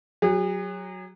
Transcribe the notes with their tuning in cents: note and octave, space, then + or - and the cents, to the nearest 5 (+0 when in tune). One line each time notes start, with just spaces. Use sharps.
F#3 +0 G#4 -40